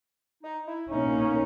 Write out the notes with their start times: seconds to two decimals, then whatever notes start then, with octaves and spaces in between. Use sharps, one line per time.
0.44 D#4
0.67 E4
0.90 B2 A#3 C#4 D#4